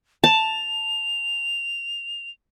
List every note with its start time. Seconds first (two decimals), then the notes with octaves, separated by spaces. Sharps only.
0.24 A5 F7